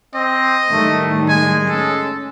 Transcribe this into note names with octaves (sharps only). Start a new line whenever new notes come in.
C4 D#5
A2 D#3 G3 A3
G#3 G#5
C#4 A4